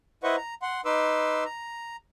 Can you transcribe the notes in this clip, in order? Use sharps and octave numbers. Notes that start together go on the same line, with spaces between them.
E4 B4 C5 D#5 F#5 C#6
A#5
F#5 C6
D#4 B4 C6 D6 E6
A#5